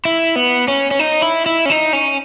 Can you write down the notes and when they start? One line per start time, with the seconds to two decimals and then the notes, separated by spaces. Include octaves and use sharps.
0.05 E4
0.36 B3
0.68 C#4
0.91 C#4
0.99 D#4
1.22 E4
1.46 E4
1.66 C#4
1.70 D#4
1.93 C#4